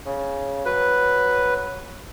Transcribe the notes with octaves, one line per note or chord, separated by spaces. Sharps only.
C#3
F#3 B4